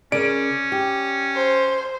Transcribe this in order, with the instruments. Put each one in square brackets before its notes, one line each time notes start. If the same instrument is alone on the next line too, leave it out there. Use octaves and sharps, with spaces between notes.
[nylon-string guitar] C#3 A#4 [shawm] C#4 [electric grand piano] D5 D7
[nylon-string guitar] G4
[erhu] C5